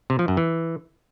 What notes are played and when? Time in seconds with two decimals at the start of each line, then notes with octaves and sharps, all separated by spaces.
0.10 C3
0.19 F3
0.28 F#2
0.37 E3